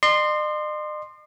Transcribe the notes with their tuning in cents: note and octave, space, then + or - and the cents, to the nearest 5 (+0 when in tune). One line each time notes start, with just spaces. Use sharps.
D#5 -45 C6 +0